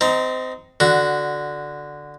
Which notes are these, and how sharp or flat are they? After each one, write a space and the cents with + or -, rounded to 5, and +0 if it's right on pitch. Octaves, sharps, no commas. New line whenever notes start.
C4 -25 D#4 +10
D3 +0 F#4 +0